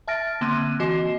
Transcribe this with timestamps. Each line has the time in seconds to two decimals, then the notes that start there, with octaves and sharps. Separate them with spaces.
0.08 E5 A5 F6 A6 A#6 D7
0.41 D3 A#3 C4 C6 F#6 D#7
0.80 E3 F#4 D#5 C7